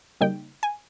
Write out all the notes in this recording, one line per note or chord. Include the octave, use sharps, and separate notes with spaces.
C#3 G3 A#3 D#4 G5
G#5